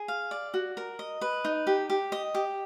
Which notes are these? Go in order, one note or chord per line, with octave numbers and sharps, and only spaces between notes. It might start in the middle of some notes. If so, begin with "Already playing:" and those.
Already playing: G#4
F5
D5
F#4
A#4
D#5
B4
D#4
G4
G4
D#5
G4